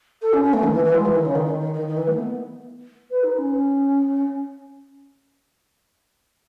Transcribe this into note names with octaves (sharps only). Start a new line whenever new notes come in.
A4
C#4
C#4
A3
D#3
E3
E3
G#3
E3
D#3
C#3
D#3
D#3
D#3
D#3
D#3
E3
A3
B3
B4
D#4
C#4